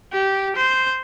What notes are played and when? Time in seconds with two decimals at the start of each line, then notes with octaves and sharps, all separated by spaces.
0.12 G4
0.56 C5